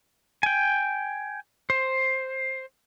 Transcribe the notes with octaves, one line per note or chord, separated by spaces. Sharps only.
G5 G#5
C5